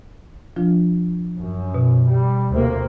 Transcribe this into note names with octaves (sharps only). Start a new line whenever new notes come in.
F3 D4 F4
F#2
B2
G3
D2 C3 A#3